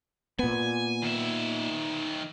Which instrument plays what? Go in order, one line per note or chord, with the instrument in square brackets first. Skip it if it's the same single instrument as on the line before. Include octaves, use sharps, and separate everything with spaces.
[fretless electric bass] A#2 B3 [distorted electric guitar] G#5
[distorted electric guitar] D#3 E5